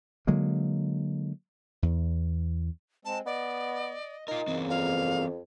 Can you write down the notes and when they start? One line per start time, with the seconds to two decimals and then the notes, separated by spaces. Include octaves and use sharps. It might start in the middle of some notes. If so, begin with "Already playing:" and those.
0.27 D3 F#3 G#3 A#3
1.82 E2
3.05 G#3 C4 A5
3.26 B3 D5 D#5
4.28 D#4 F4 A#4
4.48 E2 C#3 E3 A#3 C4
4.70 F2 F5